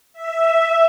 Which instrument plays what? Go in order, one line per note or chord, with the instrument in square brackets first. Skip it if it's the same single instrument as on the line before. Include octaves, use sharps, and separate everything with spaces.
[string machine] E5